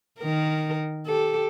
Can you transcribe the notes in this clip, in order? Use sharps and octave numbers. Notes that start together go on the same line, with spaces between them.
D#3 A#4
G4 A4